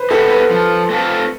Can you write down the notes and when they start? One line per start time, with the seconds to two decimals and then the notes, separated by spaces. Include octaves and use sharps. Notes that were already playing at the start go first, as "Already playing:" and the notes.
Already playing: B4 C5
0.10 B3 E4 G4 A4
0.30 B4
0.50 F3
0.90 A3 C4 F4 A4